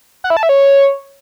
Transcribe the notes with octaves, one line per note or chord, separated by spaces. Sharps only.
F#5
E4
A5
E5
C#5